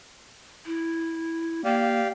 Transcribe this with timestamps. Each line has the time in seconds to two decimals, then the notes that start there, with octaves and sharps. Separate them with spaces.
0.66 E4
1.65 A#3 G4 D5 F5